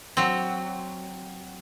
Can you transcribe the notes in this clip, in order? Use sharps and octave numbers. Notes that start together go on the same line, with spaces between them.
F#3 C4